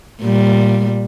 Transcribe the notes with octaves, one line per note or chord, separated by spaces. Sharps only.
A#2 G3